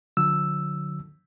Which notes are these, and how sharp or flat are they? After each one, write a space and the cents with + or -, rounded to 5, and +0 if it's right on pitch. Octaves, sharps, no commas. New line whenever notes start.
D3 +0 F#3 -45 E6 +0